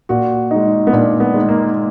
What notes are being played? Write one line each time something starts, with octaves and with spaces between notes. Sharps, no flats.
A#2 F#4
G#3 D#4
B3
A#2 D4
B3
G#3 D#4
A#3